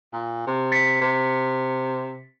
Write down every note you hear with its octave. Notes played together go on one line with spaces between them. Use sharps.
A#2
C3
A6 B6 C#7
C3